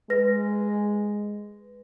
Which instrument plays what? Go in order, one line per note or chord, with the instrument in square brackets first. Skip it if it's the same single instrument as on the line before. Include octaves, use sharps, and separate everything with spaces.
[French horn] G#3 [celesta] B4 A#6